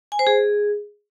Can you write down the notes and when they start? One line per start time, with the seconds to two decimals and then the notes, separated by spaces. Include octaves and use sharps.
0.12 G#5
0.19 C5
0.27 G#4